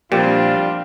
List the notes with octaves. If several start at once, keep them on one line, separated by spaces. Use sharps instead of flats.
A#2 F3 G3 C4 D4 F4 G4